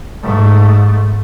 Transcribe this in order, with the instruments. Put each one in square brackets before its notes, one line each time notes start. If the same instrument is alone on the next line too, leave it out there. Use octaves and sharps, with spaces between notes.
[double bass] G#2 A3